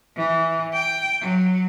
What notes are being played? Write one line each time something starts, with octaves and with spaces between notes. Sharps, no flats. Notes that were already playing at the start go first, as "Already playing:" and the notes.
E3
G5
F#3